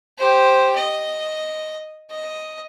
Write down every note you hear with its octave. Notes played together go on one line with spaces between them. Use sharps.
G4 C5
D#5
D#5